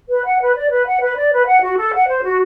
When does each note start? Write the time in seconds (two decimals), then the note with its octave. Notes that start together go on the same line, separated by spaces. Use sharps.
0.09 B4
0.25 F#5
0.40 B4
0.55 D5
0.70 B4
0.86 F#5
1.01 B4
1.17 D5
1.32 B4
1.47 F#5
1.62 F#4
1.77 A4
1.94 F#5
2.08 C5
2.23 F#4